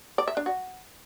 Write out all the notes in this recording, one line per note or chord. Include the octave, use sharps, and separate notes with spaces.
D5
E5
D4
F#4